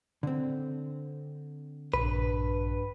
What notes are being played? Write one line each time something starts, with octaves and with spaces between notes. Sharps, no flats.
D3 C4
A#1 G2 B4